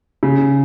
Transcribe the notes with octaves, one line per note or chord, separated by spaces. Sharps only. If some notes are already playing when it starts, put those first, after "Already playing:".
C#3